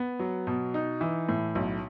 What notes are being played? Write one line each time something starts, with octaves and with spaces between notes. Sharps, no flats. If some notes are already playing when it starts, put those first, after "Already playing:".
Already playing: B3
F#3
B2
D#4
E3
A2
B1